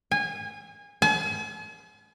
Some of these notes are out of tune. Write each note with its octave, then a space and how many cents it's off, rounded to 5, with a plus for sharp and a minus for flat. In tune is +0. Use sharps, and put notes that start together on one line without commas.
G#5 -25
G#5 +45